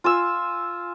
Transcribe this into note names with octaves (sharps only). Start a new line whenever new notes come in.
F4 G#5 E6